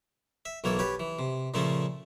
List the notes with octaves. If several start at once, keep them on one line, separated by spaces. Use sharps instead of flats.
E5
B1 E3 A#3 A4 C#5
G4 B4 C#5 A5
E3
C3
A#2 C#3 F3 A3 C#4 A4